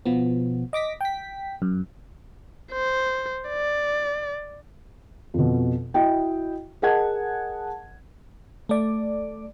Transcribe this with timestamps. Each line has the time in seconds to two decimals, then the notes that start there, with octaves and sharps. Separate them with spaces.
0.05 B2 F3 B3
0.73 D#5 D6 A#6 B6
1.01 G5 B6
1.62 F#2
2.72 C5
3.49 D5
5.34 F2 B2
5.94 E4 F#4 D#5 G5
6.82 G#4 A#4 D#5 F#5 A5 G#6
8.69 A3 D5